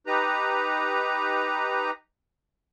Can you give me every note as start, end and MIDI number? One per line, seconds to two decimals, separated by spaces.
0.07 1.91 63
0.07 1.91 67
0.07 1.91 71
0.07 1.91 82